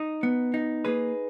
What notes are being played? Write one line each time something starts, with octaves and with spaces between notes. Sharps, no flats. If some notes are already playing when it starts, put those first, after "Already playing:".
Already playing: D#4
B3
D#4
A#3 G#4 B4